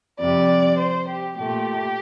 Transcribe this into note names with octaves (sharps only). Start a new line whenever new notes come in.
F2 C3 G3 D5
C5
G4
A#2 A3 G4